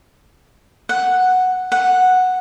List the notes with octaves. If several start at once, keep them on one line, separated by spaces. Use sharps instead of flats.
F#5
F#5